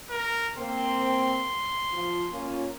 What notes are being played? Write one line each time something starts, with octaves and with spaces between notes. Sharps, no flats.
A#4
A#3 C4 C6
F3 F4
A#3 C#4 F4